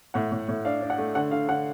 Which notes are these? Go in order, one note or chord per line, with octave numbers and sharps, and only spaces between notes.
A2 F#5
A2
A2
D4 F5
D4
F#5
A3
D3 F#5
D3 F5
D3 F#5